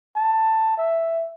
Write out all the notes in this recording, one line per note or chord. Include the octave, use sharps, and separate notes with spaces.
A5
E5